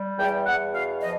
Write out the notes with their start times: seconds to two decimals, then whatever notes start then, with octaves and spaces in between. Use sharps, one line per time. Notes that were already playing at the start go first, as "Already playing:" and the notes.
Already playing: G3
0.19 E2 G5
0.46 E2 F#5
0.73 B2 F5
1.00 F3 D#5